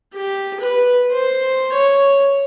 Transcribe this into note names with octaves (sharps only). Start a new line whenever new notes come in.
G4
B4
C5
C#5